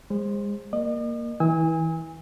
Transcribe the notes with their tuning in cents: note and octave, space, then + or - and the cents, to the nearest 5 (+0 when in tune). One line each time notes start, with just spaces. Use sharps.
G#3 -30 C5 +15
A#3 +0 D#5 -45
E3 -25 G#5 -25 E6 -45